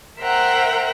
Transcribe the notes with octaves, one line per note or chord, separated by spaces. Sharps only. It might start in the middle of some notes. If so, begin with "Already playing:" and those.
A#4 C5 E5 F#5 G5 A#5